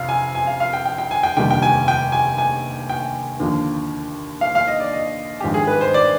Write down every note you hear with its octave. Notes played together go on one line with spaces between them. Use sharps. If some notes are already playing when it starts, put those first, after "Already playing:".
Already playing: F2 C3 F5
G#5
G#5
F5
F5
G5
G5
G5
G#5
G5
F1 D#2 D3 G3 G5
G5
G#5
G5
G#5
G#5
G5
D#2 D3 F3
F5
F5
D#5
D5
D#5
G#1 G2 F3 G#3 G4
G#4
B4
C5
D5